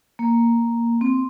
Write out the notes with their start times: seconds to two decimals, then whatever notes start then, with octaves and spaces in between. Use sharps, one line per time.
0.19 A#3
1.01 C4